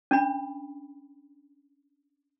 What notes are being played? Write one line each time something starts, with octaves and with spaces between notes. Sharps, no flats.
C#4 D4 B5